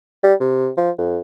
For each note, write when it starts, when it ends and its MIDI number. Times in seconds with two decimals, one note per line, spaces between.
0.23 0.34 55
0.40 0.69 48
0.77 0.90 53
0.98 1.20 41